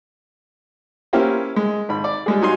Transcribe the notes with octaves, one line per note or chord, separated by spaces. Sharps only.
A#3 C#4 E4 G4 C5
G#3
G#1 B5
D5
G3 G#3 G#4
F#3 D#4 G#5 C6